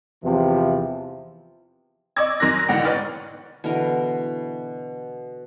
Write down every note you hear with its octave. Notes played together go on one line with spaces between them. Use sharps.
E2 C3 E3 F3
D5 D#5 C#6 D6 E6 G#6
F#2 D#3 A#4 C6 F#6 A#6
G#2 B2 D3 E3 F#5 G5
B4 C#5 D5 G5 F6 A6
B2 D3 E3 A#4